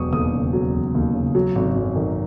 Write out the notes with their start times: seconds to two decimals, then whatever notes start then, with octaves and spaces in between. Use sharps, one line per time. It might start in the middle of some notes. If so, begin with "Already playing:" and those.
Already playing: E1 F#3 C#6 D#6
0.13 D#2 D#6
0.33 C#3
0.53 F#3
0.73 E1
0.95 D#2
1.14 C#3
1.35 F#3
1.55 G#1
1.76 F#2
1.96 D#3